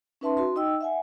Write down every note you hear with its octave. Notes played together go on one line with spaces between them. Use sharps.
C#4 D#4 B4 E5 A5 C6
F#4 C6
D#4 D#5 G5 E6
E5 F#5 G#5